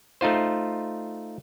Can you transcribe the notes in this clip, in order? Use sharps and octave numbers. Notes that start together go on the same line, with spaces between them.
A3 D#4 F4 C5